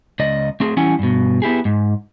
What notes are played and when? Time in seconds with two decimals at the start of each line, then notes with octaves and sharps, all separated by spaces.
0.19 C#2 D5 D#5
0.60 A3 C4 G#4
0.77 E3 G3 C#4 E4 F#5 G#5
0.99 G2 B2
1.42 B3 E4 G4 G#4
1.65 G#2